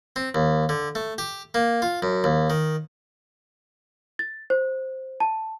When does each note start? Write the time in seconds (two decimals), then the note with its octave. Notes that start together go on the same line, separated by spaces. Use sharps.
0.16 C4
0.35 D#2
0.69 D3
0.95 A3
1.18 G4
1.54 A#3
1.82 F4
2.02 F#2
2.24 D#2
2.50 D#3
4.19 A6
4.50 C5
5.20 A5